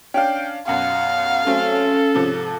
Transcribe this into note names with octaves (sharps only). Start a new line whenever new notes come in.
C#4 D4 F5 G5
F#2 B2 F5 F#5
F#3 A3 C4 C#4 A4
G#2 C3 F3